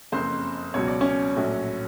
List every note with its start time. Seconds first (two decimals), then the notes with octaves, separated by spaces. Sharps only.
0.12 F#1 F2 C#3 C4 C5
0.74 C#2 B2 F#3 C#5
0.88 D5
1.01 C#4 C#5
1.36 A#1 A2 F#3